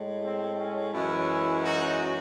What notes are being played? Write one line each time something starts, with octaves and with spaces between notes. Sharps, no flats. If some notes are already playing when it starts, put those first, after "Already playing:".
Already playing: A2 G#3
C4
C#4
F#2 E3 G#3 C#4 E4
D#4 F#4